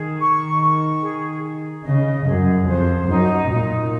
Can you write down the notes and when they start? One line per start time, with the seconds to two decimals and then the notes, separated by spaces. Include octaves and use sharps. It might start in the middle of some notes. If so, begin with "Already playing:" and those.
Already playing: D#3 G#4
0.18 C#6
0.60 C#6
1.01 G#4
1.42 G#4
1.84 C#3 D#5
2.25 F#2 G#4
2.67 F2 C5
3.08 F#2 D#4
3.49 A#2 D#4